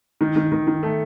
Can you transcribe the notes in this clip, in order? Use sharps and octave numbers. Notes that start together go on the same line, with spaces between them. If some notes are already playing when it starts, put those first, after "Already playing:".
D#3
D#3
D#3
D#3
A3